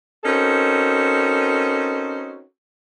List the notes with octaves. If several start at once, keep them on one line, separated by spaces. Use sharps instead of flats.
C4 C#4 D#4 F#4 A4 A#4